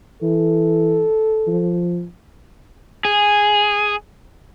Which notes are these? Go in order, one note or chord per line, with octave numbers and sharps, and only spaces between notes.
E3 A4
F3
G#4